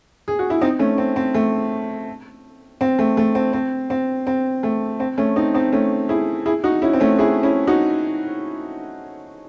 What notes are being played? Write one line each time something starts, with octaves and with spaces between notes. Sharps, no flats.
G#4
F#4
E4
C4 D#4
A3 C#4
C4
C4
A3
C4
A3
A3
C4
C4
C4
C4
A3
C4
A3 C#4
C4 D#4
C4 D#4
A3 C#4
E4 G#4
E4 G#4
D#4 F#4
C#4 E4
C4
A3 C#4
E4 G#4
C#4 E4
D#4 F#4